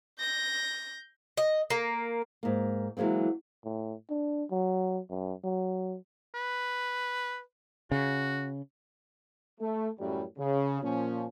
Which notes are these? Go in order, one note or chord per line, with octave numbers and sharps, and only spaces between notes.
G6 A#6
D#5
A#3
G#2 A#3
E3 F#3 G#3 A#3 C4
A2
D4
F#3
F#2
F#3
B4
C#3 F#4
A3
A1 F#2 A2 G3
C#3
A#2 F3 C#4